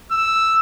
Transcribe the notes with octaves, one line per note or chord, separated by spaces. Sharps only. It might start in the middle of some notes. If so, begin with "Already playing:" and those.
E6